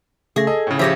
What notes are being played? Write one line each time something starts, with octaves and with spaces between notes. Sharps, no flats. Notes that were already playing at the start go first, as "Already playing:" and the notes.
C#3 A3 G#4 A#6
A4 D#5
A2 C#3
F3 G4 C#5 E5 A#6